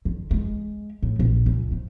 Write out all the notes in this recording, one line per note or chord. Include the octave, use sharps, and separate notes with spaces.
D3
G#3
A2
A#1
C#2
G#2